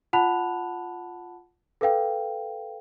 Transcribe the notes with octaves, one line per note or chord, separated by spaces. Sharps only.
F4 F#5 A5 B5 F#6 F7
A4 B4 F5 G5